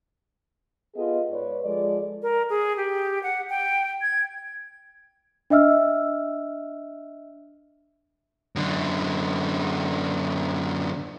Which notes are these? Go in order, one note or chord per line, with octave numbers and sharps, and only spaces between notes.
B3 F4 G#4 A4 D#5
G#2 B4 C#5 D5
F3 G#3 A4 D5
A#4
G#4
G4
F#5
G5
G#6
D4 D#5 E5 E6 F6
F#2 D3